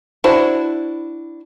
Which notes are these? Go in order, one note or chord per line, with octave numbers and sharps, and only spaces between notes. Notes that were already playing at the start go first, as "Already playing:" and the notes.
D4 E4 F#4 C5